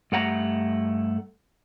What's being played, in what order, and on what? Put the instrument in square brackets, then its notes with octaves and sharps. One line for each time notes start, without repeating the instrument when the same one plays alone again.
[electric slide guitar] G2 A3 F#5 A#5